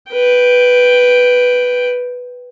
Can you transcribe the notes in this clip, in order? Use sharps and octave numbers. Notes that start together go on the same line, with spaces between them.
B4 G5